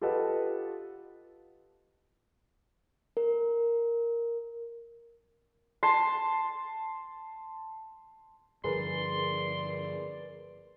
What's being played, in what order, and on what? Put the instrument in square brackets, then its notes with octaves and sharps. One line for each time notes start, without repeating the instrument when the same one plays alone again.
[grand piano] F4 G4 A4 B4 D#5 F#5
[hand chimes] A#4
[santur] A5 C6
[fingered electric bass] G2 D3 F3 [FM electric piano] G#4 A#4 B4 [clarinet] D5 [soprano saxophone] C6